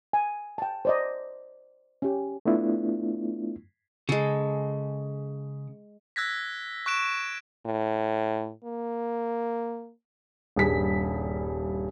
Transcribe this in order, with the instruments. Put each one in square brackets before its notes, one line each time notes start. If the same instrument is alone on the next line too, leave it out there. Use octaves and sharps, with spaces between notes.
[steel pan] G#5
G5 A5
C5 D5 D#5
C#4 G4
[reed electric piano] A3 B3 D4 E4 F4
[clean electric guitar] C#3 [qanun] G#3 A4
[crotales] E6 F#6 G#6 A#6 B6
C#6 F#6 D7 E7
[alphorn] A2
A#3
[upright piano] D#1 G2 G3 G#4 B6